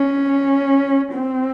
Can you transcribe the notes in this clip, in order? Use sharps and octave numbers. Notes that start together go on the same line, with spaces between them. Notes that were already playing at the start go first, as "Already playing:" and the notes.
Already playing: C#4
C4